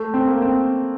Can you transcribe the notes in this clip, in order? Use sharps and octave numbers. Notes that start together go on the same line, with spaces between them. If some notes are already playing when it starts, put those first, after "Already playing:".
Already playing: A3
C4
A#3
C4